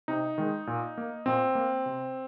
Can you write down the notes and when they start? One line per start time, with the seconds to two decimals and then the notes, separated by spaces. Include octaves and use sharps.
0.08 C3 D#4
0.38 D#3 G#3
0.67 A#2
0.97 A#3
1.26 A#2 C4
1.55 A#3
1.86 C3